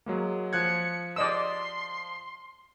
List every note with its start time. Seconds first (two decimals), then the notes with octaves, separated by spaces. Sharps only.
0.06 F#3 G#3 A#3
0.53 F3 F#6 G#6 C#7
1.16 D5 D#5 C6 E6